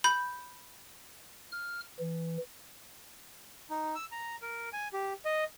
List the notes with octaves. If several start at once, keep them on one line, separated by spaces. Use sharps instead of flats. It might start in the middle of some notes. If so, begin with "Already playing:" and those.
B5 G6
F6
E3
D#4
E6
A#5
A#4
G#5
G4
D#5